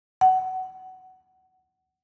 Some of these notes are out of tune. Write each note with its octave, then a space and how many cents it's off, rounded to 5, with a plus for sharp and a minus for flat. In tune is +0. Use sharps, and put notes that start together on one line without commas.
F#5 +20